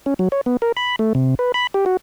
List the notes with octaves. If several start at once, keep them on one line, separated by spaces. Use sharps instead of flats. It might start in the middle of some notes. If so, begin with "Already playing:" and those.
C#4
F#3
C#5
B3
A#4
B5
A3
C3
B4
B5
G4
F#4